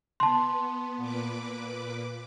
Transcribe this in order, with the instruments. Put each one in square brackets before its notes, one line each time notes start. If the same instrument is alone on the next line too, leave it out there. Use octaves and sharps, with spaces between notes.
[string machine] B3 [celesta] A5 C6
[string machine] A#2 B4 D6